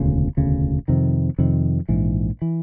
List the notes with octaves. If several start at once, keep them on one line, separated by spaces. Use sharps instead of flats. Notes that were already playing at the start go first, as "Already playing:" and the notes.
Already playing: E1 D2 C#3
E1 D2 C#3
F2 C3 D#3
F2 C3 D#3
A#1 G#2 E3
E3